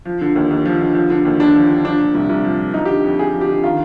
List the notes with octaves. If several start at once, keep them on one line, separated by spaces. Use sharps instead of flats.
F3
D3
D#2
D#2
F3
D3
F3
D3
D#2
D#2 D4
F3
D3
F3 D4
A#2
C2
C2
F3
A#2
F3 D#4
D3 G4
F2
F2 G#4
F3
G4
D3
D#3 F4